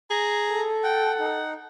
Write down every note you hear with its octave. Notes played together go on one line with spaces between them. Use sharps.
G#4 A#5
A4
F#5 G5
D#4